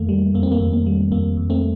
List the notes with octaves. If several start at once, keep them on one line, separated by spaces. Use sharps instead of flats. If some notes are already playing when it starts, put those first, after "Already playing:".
Already playing: F2 D#3 A3 A#3
G3
F2 A#3
C4
A#3
F2
A#3
G3
F2 A#3
F2
A3 C4